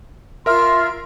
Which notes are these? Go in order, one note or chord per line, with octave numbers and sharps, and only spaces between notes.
F4 A#4 E5 C6 F6